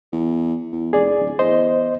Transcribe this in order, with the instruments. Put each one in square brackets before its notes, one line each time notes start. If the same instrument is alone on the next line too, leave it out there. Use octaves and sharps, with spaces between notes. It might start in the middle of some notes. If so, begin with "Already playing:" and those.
[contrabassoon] E2
E2
[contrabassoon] F1 [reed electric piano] G#4 D5
[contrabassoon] D1
[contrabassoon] E2 [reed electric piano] C5 D#5